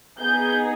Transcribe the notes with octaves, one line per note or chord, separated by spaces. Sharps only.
B3 D#4 G#4 G6